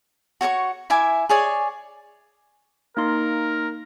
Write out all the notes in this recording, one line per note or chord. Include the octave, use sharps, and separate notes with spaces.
F#4 C#5 A#5 C#6
E4 E5 G#5 D6
G#4 C#5 D5 G#5
A#3 D#4 A#4 C6